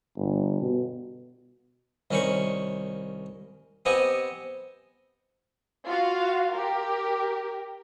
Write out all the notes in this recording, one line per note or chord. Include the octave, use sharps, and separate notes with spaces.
G1
B2
C2 D#3 C#4 C5 B5 C#6
B3 C4 G4 D#5 F#5 G#5
F4 F#4 F5
G4 A#4